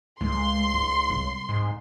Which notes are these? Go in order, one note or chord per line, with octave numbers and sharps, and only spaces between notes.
C#2 G#3 C6
D#4
C2
G#2